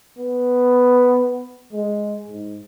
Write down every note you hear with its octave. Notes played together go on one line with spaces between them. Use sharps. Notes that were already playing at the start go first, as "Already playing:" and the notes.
B3
G#3
G#2